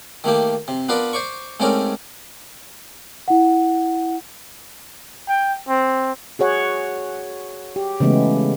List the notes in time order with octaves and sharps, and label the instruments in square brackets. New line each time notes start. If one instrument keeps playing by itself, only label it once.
[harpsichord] D#3 A3 A#3 G4
C3
B3 D4 F4 A#4 B4 D5
C5 D5 C#6
G#2 A3 C4 C#4 A#4 D5
[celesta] E4 F#5
[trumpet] G5
C4
[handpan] F#4 G#4 C#5 F#5
G4
C#3 E3 G#3 A3 B3